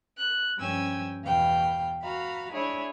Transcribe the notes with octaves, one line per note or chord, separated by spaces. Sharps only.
F#6
G2 F3 C#4 G5 G#5 E6
E2 B2 F5 G5
F#4 F5 A#5 B5
D4 E4 G#4 C#5